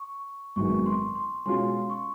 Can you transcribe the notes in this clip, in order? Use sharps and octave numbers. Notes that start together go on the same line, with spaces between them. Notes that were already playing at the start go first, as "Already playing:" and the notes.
Already playing: C#6
G#1 F#2 D#3 G#3 B3 C#6
C6
C6
B2 G#3 C#4 F4 C6
C#6